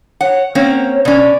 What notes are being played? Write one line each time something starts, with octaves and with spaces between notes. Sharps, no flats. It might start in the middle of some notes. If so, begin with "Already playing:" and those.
C#5 F#5
A#3 C4 C#4 C#5
B2 C#4 D5